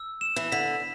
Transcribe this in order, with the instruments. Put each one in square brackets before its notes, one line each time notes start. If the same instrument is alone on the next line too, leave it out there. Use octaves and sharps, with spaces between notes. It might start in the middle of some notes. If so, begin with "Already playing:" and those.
Already playing: [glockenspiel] E6
E7
[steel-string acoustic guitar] E3
[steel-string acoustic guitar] D3 [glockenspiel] B6